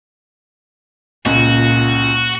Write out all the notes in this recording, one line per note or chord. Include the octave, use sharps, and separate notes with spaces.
C#2 A#2 F#4